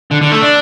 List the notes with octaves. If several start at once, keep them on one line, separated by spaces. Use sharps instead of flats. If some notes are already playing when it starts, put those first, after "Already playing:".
D3
D3
A3
D4